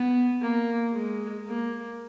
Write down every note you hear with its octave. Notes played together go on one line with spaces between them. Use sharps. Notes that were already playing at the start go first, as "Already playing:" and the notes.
Already playing: B3
A#3
G#3
A#3